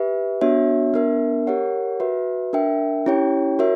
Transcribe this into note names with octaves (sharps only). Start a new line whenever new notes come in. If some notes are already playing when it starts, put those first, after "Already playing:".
Already playing: G4 B4 E5
B3 D4 F#4 C#5 E5
B3 D4 A#4 E5
G4 A#4 C#5 F#5
F#4 B4 E5
D4 A#4 E5 G5
C#4 E4 G4 C#5 G5
F#4 A#4 C#5 E5